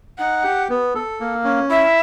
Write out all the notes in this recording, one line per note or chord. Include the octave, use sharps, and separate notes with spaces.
D#4 F#5
G4
B3
A4
A#3
C#4
E4 E5